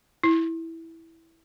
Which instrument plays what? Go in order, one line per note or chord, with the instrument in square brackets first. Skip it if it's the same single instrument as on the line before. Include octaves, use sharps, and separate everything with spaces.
[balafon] E4